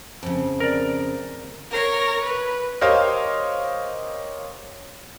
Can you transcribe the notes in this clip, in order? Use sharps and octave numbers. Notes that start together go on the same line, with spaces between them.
F2 C#3
A#4 D5
A#4 C#5
B4
G4 A#4 C5 C#5 D#5 F5